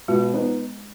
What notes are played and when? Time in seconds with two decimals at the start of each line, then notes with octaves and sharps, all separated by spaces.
0.08 B2 G#3
0.34 B3 D#4